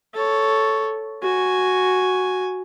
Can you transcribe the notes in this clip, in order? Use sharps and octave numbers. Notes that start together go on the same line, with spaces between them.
A4 C#5
F#4 G#5